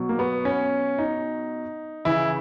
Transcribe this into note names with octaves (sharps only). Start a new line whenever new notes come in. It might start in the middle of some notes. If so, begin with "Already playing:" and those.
Already playing: B2 F#3
A#3
B3
C#4
D#4
C#3 E3 E4